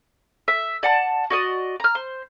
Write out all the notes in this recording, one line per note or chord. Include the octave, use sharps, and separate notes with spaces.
E5
D5 F#5 A5
F#4 D5 D#5
A#5 F6
C5